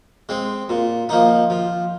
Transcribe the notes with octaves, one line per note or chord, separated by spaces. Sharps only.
G#3 C4
A#2
F3 A#3 D#4
F3